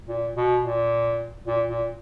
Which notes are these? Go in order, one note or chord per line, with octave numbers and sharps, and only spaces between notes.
A#2
B2
A#2
A#2
A#2